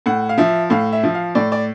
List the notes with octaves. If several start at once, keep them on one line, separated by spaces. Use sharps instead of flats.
A2 F#5
F5
F3 E5
A2 F5
E5
F3
F5
A2 D5
D5